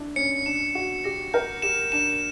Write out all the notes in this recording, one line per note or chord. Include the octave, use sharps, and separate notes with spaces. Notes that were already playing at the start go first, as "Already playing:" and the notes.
Already playing: D4 E4
C#4 C#7
D4 E7
F#4 E7
G4 A#6
A#4 G6
G4 E7
D4 E7